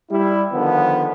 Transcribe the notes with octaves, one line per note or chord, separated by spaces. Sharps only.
G3 E4
D3 D#3 F3 B3